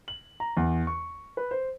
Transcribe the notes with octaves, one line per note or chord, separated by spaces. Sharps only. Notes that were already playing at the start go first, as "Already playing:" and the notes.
F#7
A#5
E2
C#6
B4
C5